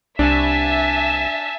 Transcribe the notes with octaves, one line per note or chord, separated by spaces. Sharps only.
C2 D4 E5 G#5 A5